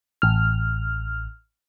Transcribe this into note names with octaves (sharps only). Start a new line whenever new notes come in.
A1 F6